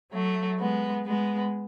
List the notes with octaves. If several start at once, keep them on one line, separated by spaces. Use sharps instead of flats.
F#3 A3
G#3 B3
G#3 B3